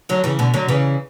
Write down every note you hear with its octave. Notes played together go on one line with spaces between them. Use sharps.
D3 F#3
C#3 E3
B2 D3
D3 F#3
C#3 E3